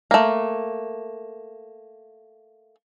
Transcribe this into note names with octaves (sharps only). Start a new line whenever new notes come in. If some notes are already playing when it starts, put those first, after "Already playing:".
A3 A#3